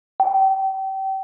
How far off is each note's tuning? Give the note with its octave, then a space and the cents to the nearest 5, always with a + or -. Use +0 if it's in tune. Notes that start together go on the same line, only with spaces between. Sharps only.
G5 -30